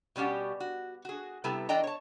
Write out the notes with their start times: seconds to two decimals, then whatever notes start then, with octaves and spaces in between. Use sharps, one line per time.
0.16 B2 G3 C#4 G4 F#5
0.60 F#4
1.05 F#4 G#4
1.44 C3 G3 B3 E4 A4 B4
1.69 E3 D4 D5 D#5 G5 A#5
1.84 C#5 A5